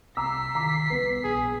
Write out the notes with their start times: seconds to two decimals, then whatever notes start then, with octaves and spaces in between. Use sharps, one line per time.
0.17 C2 A#5 D6 E6 B6 C7
0.55 D#3 A#5 D6
0.90 C2 B3
1.24 A#1 G#4